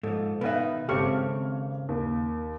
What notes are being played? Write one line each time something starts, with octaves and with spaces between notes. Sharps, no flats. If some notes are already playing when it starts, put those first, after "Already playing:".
G#2 F3 A4
B2 D#3 D#4 B4 E5 F5
G#1 C#3 C4 G4 A4 C#6 F6
D#2